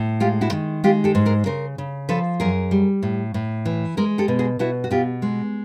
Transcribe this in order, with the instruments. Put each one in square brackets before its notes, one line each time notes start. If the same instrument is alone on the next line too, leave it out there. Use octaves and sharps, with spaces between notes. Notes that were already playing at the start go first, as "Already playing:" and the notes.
Already playing: [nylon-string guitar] A2
G#3 F4 G4
E4 F#4
D#3
G#3 F4 G4
G4 A4
G#2
G#4 A#4
C#3 A#4 C5
C#3
F3 A4 B4
F#2 G#4 A#4
G3
A2
A2
E3
G#3 G#4 A#4
G4 A4
B2
F#4 G#4
B2 E4 F#4
F#4
B2 F4 G4
G#3